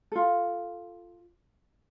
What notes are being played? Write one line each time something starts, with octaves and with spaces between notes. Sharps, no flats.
F4 A4